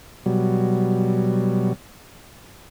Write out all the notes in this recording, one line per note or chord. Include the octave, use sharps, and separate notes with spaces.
B2 F#3 G3